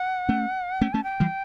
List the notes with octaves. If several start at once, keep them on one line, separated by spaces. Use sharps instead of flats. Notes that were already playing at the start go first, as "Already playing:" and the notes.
Already playing: F#5
A3 C#4
A3 C#4 G5
A3 C#4 A5
G5
E3 G3